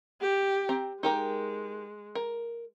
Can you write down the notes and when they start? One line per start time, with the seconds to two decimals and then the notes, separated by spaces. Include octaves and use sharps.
0.21 G4
0.69 C4 A#5
1.03 G#3 D#4 G4 A#4
2.15 A#4